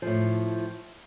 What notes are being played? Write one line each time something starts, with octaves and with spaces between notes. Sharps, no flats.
A2 F3